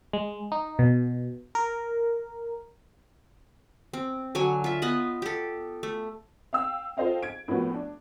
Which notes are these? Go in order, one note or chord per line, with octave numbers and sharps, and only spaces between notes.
G#3
D#4
B2
A#4
C4
D3 F#3 C#5 G#5
F4 E5
B3 D#5 B5
G4 A4
A3
F5 G5 E6
F4 A4 C5 D#5 F5 G5
G#6 D7
A2 F3 A#3 B3 C#4 F#4
D4